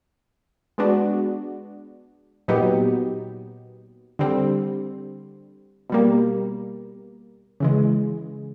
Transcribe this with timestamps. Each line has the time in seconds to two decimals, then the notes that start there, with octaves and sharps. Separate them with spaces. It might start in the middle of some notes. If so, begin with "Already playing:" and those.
0.78 G#3 B3 D4 F#4
2.48 A#2 F#3 B3 D#4 G4
4.19 D3 G3 C4
5.90 B2 G3 A#3
7.60 C#3 E3 G#3